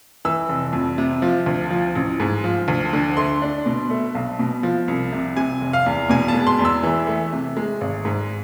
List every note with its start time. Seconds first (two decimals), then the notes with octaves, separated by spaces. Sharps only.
0.25 E3 E6
0.49 F1
0.73 F2
0.98 C3
1.22 F3
1.46 D2
1.70 F3
1.95 A1
2.20 G#2
2.44 F3
2.68 D2
2.93 D3
3.17 A3 C6
3.42 D4
3.66 B2
3.90 A3
4.15 B1
4.39 B2
4.63 F3
4.88 C2
5.12 C3
5.37 C3 G#5
5.61 F1
5.73 F5
5.86 E2
6.09 B2 G#5
6.28 A5
6.35 G#3
6.47 C6
6.59 E2
6.65 E6
6.83 E3
7.07 A3
7.33 C3
7.57 G#3
7.81 G#1
8.05 G#2